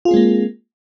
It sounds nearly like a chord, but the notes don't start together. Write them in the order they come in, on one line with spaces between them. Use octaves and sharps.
F4 G#4 C4 G#3 A#3